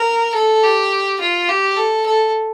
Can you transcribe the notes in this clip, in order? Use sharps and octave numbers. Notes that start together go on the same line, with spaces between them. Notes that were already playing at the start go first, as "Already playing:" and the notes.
Already playing: A#4
A4
G4
F4
G4
A4
A4